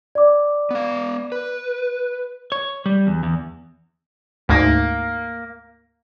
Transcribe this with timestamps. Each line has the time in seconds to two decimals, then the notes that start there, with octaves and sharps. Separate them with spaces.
0.15 D5 D6
0.71 B3 F5
1.32 B4
2.52 C#5
2.86 G3
3.07 E2
3.23 E2
4.49 D2 G#2 A#3